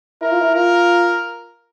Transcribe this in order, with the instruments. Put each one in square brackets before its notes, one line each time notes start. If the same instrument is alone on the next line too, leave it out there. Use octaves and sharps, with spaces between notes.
[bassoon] E4 [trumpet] A#4
[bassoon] F4
E4
[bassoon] F4 [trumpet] A#4